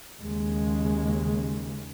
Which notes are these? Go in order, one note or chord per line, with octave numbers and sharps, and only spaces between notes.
D#2 C#3 G#3